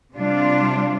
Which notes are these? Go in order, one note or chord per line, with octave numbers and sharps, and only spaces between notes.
C3 G3 D4 F4